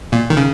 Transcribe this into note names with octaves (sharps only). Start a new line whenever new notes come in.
A#2
D#3
C#3